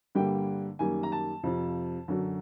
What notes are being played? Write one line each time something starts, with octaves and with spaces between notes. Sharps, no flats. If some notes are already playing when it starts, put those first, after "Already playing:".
G2 D3 G3 A#3 G5
F#2 D#3 G3 A#3 G#5
A#5
A5
F2 C3 F3
F#2 D3 F#3